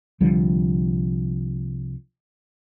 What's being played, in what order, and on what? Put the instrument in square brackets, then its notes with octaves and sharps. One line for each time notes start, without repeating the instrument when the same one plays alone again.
[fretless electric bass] C2 D3 F3 G3